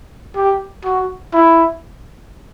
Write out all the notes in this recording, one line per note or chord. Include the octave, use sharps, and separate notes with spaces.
G4
F#4
E4